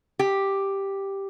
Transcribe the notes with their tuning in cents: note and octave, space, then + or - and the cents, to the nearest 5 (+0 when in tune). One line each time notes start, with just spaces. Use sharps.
G4 +0